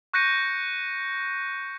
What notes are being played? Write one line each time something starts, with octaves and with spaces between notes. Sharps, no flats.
C#6 F#6 G6 A#6 C#7 D#7